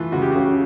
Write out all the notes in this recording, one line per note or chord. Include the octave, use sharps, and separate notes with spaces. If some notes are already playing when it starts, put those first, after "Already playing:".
Already playing: E3 A3 F4
C#2 F#4
G4
C#3 F#4